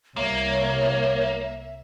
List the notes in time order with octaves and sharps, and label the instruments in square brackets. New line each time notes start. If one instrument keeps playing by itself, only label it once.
[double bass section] C2 [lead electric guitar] A#3 [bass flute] C#5 [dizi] E5